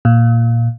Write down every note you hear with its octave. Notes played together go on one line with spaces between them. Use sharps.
A#2